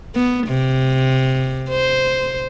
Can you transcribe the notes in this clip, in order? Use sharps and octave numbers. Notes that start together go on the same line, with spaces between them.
B3
C3
C5